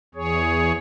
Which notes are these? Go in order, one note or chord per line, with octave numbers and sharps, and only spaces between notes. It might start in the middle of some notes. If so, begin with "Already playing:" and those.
E2 G#4 C#5